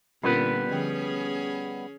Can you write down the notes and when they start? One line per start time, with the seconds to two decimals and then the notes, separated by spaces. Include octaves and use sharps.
0.24 A#2 D3 G3 B3 C#4 F4 A#4 B4
0.70 D3 F3 C#4 G#4 G5